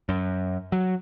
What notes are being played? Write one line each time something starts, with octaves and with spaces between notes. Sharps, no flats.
F#2
F#3